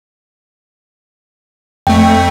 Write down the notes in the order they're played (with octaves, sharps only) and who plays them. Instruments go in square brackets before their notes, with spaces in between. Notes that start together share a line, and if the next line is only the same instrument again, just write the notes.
[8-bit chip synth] F2 A3 [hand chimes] G5